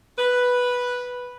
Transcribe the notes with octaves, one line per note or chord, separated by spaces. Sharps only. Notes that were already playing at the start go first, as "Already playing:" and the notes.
B4